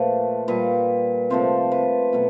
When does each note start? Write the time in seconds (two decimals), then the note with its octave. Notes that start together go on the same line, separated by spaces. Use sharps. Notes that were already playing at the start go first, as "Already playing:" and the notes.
Already playing: A#2 F3 A3 B4
0.48 A#2 G3 B4
1.30 C3 F3 A3 C5
1.72 B4
2.13 B2 F#3 A3